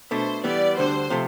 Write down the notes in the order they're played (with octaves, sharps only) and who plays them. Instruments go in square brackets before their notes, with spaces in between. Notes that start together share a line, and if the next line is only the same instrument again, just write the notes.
[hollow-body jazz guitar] B2 A3 D4 [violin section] C5
[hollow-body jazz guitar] E3 G3 B3 [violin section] D5
[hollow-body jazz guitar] D2 D3 G3 D4 [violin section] C5
[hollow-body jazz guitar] C3 F3 A3